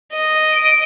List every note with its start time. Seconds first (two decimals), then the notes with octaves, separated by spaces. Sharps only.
0.12 D#5
0.52 D7